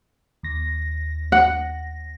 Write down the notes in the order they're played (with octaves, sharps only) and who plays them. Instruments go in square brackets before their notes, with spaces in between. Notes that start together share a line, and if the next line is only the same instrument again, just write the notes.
[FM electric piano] D#2 A#6
[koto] F#5